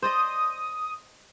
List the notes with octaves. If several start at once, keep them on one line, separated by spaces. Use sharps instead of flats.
C5 D5 D#5 D#6